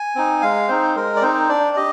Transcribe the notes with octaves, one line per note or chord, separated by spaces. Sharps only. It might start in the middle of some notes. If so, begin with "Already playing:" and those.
Already playing: G#5
C4 D#4
G#3 F5
C4 D#4 C5
G#3 A#4
D5
C4 D#4 C5
D4 D5
G4 D#5